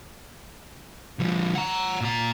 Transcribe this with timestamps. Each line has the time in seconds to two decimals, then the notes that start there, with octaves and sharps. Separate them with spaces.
1.19 D3 F3
1.55 F#5 A#5
2.01 A#2 A#5